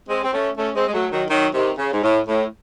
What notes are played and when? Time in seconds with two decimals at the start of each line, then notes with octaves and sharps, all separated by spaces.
0.09 G#3 C4
0.24 C4
0.33 A3 C#4
0.58 A3 C#4
0.75 G#3 C4
0.87 G#3
0.94 F#3 A3
1.12 D#3 F#3
1.30 D#3 F#3
1.54 C3 D#3
1.78 C#3
1.93 G#2
2.03 A2
2.28 A2